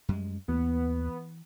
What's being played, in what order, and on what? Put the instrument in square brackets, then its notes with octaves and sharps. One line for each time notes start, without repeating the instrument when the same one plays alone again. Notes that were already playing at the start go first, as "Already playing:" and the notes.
[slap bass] F#2 G3 G#3
[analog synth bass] D#2 [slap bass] E3 [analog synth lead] B3